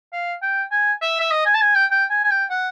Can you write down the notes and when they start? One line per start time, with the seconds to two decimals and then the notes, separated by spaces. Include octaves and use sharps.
0.13 F5
0.42 G5
0.72 G#5
1.02 E5
1.20 E5
1.31 D#5
1.46 G#5
1.54 A5
1.62 G#5
1.75 G5
1.91 G5
2.10 G#5
2.24 G#5
2.31 G5
2.50 F#5